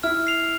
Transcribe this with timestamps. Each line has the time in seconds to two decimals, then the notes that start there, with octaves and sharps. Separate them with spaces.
0.03 E4 F6
0.27 C7 F7